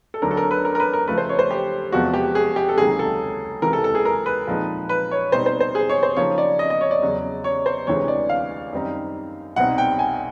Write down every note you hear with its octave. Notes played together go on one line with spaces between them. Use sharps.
A4
D2 D3 F#3 A#4
A4
A#4
B4
A#4
A#4
B4
A#4
C#3 F3 A3 B4
C5
C#5
C5
G4
E2 C3 F3 G#3 B3 F#4
G4
G#4
G4
A4
C#2 C3 D#3 F#3 A#3 G#4
A4
C#2 C3 E3 A#4
A4
A4
G#4
A#4
B4
A#2 F3 G#3 C4 D#4
B4
C#5
B2 G3 C4 D#4 C5
C5
C5
G#4
C#5
C5
C#3 F3 A#3 D#4 C#5
D5
D#5
D#5
C#5
D5
E2 C#3 F#3
C#5
C5
D2 C3 E3 G#3 C#5
D5
F5
F#2 D#3 G3 C4 D#4
C2 B2 G3 C4 D#4 F#5
G5
G#5